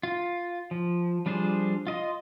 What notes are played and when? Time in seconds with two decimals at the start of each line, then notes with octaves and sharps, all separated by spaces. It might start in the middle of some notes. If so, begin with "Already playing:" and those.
0.03 F4
0.71 F3
1.26 F3 G3 D4 G#4 C5
1.87 F4 D#5 C6